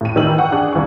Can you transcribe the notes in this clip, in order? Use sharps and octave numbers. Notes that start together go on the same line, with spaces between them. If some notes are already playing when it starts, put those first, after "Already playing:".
A2 D#7
D#3 E3 E6 F#7
F#5 G5 C#6
D4 G#4 F#6
C2 E3 D4 C#6